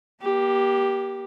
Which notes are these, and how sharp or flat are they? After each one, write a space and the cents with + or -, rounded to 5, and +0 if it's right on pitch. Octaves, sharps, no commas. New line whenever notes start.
A#3 +40 G4 +0